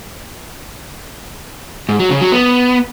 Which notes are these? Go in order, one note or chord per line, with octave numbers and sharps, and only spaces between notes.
G#2
F#3
C#3
F#3
B3